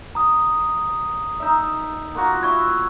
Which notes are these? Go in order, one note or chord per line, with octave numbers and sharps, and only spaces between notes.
A#5 D#6
D#4 E5
A#3 F4 F#4
E4 E5 C#6 G#6